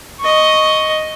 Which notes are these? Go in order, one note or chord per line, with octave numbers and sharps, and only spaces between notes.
D#5 C#6